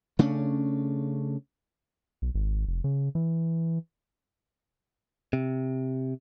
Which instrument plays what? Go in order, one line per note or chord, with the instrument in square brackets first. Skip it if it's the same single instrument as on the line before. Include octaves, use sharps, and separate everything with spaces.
[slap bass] C#3 A3 C#4 D4
[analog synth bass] B1
G#1
F1
C#3
E3
[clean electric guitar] C3